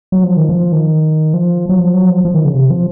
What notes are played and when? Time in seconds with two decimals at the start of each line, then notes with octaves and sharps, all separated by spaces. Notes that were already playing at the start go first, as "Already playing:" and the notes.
0.12 F#3
0.24 F3
0.37 D#3
0.49 F3
0.72 D#3
1.34 F3
1.69 F#3
1.79 F3
1.94 F#3
2.09 F3
2.25 F3
2.34 D#3
2.45 C#3
2.54 C3
2.70 F3